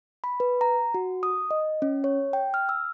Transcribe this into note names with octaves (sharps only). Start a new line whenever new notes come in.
B5
B4
A#5
F#4
D#6
D#5
C#4
C#5
G5
F6
E6